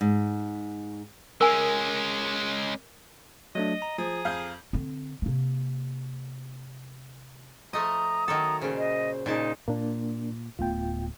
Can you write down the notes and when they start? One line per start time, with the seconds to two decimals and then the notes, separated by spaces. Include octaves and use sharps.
0.01 G#2
1.41 G#3 C#4 A#4 G#5
3.55 F#3 A3 D4 D#5
3.82 A#5
3.98 F3 G#4
4.25 F2 F5 G6
4.73 D3 C4
5.22 C3 A#3
7.73 F3 A3 D#5 A#5 D#6
8.28 D#3 F#3 A4 A#5
8.62 A#2 C#3 C5
8.77 D#5
9.26 A#2 C#3 D#4 A5
9.68 A#2 A#3 D4
10.59 D1 A3 B3 F4 G5